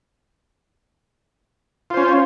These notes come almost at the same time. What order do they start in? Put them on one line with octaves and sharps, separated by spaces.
F4 C5 C#4